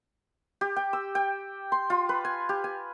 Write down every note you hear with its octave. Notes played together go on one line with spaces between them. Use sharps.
G4
G5
E6
G5
C6
F4
B4
G#5
G4
G#5